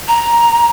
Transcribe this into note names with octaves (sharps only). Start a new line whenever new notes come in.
A#5